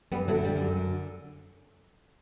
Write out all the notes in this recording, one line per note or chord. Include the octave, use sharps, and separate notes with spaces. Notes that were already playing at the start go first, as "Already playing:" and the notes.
F#2 G3 B3
F#3 A3
D3
G3
F#2
D3